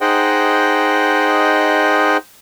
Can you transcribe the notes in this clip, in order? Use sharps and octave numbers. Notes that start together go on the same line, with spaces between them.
D#4 G#4 C5 D#5 F#5 G5